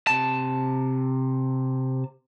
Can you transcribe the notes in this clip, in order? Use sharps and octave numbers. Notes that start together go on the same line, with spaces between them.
C3 A5